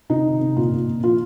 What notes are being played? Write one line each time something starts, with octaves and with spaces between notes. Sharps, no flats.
C3 D#4
D#3
C3
A#2 F4
A#2
A#2
F3 F4